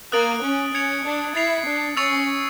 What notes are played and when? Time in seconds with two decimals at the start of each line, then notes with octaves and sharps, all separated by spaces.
0.12 A#3 D#6 F#6 A6 D7 F#7
0.43 C#4
0.74 C#4 G#6 C#7 F7
1.05 D4
1.35 E4 A6 C7 F7
1.66 D4
1.97 C#4 C#6 E6 A6 C#7 F7